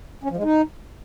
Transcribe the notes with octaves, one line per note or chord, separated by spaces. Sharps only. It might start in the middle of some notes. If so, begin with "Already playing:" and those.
C#4
F3
G#3
D#4